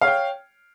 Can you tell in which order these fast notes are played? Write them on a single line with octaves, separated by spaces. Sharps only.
F5 C#5 G5